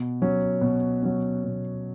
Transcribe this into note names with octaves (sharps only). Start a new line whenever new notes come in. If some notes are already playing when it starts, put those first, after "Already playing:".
Already playing: B2
F#3 C#4
B2
F#3 C#4
B2